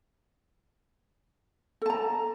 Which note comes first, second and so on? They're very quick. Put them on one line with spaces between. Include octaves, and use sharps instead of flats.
A4 A5 A#5